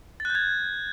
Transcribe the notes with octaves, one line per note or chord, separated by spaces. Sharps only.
A6
F#6
G6
G#6